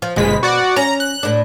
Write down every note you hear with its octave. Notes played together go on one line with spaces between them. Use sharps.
F3
G1 B2 G#3 B6
F#4 D5 F#5
C#4 A#5
F#6
A2 D4